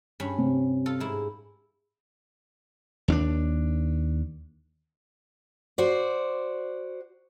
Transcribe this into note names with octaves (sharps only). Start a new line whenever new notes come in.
G2 C#4 B5
C3
F4 A4
G#2 E4
D#2 C#4 D4
F#4 C5 D5